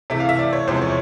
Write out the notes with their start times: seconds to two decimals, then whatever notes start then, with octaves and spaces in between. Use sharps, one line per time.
0.10 C3 E3 A3 E5
0.20 F5
0.29 E5
0.39 D5
0.53 C#5
0.67 E2 C3 F3 G#3 C5
0.82 C#5